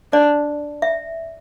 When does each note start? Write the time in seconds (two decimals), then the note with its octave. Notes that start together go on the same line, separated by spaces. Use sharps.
0.13 D4 D5
0.82 E5